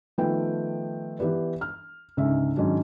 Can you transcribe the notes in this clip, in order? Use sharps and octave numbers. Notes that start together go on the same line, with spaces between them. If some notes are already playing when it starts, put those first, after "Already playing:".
D#3 F3 A3 B3 B4 G5
E3 B3 G4 B4 D5
F6
C#2 G#2 D3 C#4 E5
G#2 D#3 F#3 C#4 D4